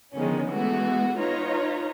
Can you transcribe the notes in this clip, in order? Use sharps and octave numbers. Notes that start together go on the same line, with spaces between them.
D3 D#3 F3 G#3 B3 C#4
E3 G#3 A3 B3 F#4
D#4 F4 B4 C#5 A#5